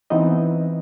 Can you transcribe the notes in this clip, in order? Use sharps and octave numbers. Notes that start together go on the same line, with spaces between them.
E3 B3 C4 D#4 D#5